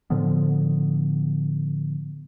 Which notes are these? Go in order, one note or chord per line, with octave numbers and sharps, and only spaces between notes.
A2 D3 F3 B3